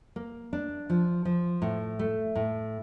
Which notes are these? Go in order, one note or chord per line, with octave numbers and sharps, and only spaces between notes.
A#3
D4
F3
F3
A2
A3
A2